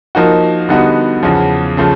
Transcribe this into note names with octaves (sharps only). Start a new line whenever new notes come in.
F3 A#3 D#4 F#4
D3 G3 B3 D#4 F#4
E2 C#3 F3
C#3 F3 A3